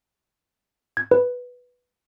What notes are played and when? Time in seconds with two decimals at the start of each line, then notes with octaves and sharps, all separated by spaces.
0.97 G#6
1.11 B4